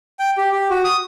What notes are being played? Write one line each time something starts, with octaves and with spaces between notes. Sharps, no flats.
G5
G4
G4
F#4
D#6